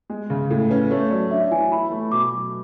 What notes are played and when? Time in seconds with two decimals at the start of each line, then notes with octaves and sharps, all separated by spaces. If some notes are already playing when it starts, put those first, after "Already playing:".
0.10 G#3
0.30 C#3
0.50 A2 A4
0.70 C#4 B4
0.91 A3 C#5
1.02 C#5
1.11 F#3 D5
1.31 D4 E5
1.51 E3 G#5
1.72 E4 B5
1.92 A3
2.12 B2 D6
2.32 F#3